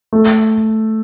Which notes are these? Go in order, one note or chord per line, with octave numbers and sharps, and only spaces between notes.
A3